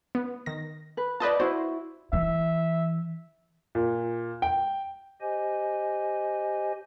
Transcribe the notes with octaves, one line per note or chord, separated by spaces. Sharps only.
B3
D#3 A#6
B4
F4 B4 C5 D5 D#5 A5
E4 F#4 C5
E3 E5
A#2
G5
G4 C5 D#5 G#5